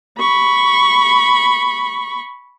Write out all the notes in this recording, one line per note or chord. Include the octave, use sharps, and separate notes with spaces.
B5 C#6